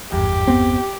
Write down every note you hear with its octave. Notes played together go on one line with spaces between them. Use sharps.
G#1 E2 G2 G4
B3 C4